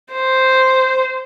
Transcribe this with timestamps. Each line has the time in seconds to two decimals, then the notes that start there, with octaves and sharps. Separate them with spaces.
0.13 C5